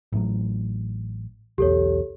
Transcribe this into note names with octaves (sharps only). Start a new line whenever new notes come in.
A1 A2 F#3
B1 E2 G4 A4 C#5